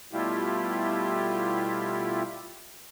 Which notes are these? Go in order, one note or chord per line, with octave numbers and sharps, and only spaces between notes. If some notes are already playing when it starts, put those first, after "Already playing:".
B2 G3 A3 E4 F4 G4